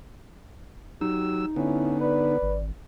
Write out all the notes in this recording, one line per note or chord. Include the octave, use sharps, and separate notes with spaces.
F#3 D#4 G4 E6
D3 B3 C#4 E4
B4 D5
G#1